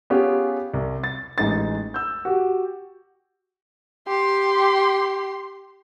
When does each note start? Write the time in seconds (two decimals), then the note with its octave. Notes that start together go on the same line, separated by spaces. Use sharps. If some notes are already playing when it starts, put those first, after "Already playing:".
0.10 B3 C#4 F4 G4 G#4
0.74 C2
1.04 A6
1.38 A1 G#3 D#4 A6
1.94 E6 G6
2.25 F#4 G4
4.08 G4 C6